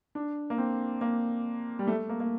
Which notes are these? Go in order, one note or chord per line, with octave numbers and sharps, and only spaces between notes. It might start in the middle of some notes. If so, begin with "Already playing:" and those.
D4
A#3
C4
A#3
G3
A3
A#3
A#3